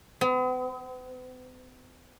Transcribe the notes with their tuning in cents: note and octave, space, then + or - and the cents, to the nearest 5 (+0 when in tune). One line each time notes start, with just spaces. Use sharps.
B3 +45